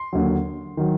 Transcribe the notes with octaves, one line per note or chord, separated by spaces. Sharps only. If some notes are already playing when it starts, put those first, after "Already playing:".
Already playing: C6
D#2 D3 F#3
D#3 F#3